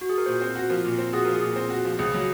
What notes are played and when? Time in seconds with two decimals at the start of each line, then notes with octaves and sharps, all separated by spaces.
0.01 F#4
0.10 G#4
0.18 A#4
0.26 A#2 C5
0.41 C4
0.55 F#4
0.70 F3 A#4
0.85 A#2
0.98 C4
1.13 F#4 G#4
1.25 F3 A#4
1.36 G#4
1.42 A#2
1.56 C4
1.70 F#4
1.85 F3
1.99 C#2 G#4
2.14 F#3